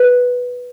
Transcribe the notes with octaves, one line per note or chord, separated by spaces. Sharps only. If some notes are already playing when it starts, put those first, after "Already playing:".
Already playing: B4